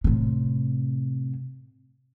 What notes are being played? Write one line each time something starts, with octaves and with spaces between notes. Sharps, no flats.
A2 C3